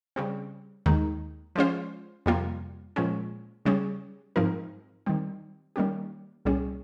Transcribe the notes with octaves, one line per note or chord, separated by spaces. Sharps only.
C#3 G3 C4
D#2 D#3 G#3 D#4
F3 G#3 C#4 F4 C5
F2 C3 G3 A#3 F4
A#2 F3 G#3 C#4
C#3 G3 C#4 G#4
G#2 F3 C4 D#4 A#4
D#3 G3 C4
D#3 G3 A#3 C#4 G4
C2 A#2 G3 C#4 G#4